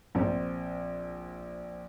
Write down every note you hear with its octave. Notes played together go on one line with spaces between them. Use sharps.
A#1 C4